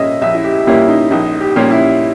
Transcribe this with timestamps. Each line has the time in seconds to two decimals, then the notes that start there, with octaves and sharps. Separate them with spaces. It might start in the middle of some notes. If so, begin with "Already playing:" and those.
Already playing: A#2 G3 A#3 C#4 D#5 E5
0.21 A#1 E5
0.35 E4
0.44 G4
0.67 A#2 G3 A#3 C#4 E4
0.88 D#4
1.11 A#1 D#4
1.41 G4
1.56 A#2 G3 A#3 C#4
1.71 E4